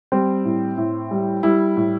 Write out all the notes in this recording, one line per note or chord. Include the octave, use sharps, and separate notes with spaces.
G3 C4
A2
A2
G3
G3 E4
A2